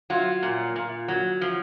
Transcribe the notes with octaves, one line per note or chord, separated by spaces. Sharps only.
F#3 F4
A#2
A#2
F#3
F3